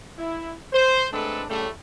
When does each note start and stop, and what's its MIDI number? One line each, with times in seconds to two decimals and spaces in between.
0.18 0.53 64
0.73 1.07 72
1.12 1.42 56
1.12 1.42 57
1.12 1.42 60
1.12 1.42 62
1.12 1.42 69
1.12 1.42 71
1.48 1.68 45
1.48 1.68 49
1.48 1.68 55
1.48 1.68 57